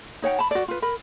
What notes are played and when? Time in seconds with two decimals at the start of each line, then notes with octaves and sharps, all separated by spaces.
0.22 D#4 C#5 F#5 G5
0.39 A5 B5
0.51 F#4 D5
0.68 F4 B4
0.82 A#4 B5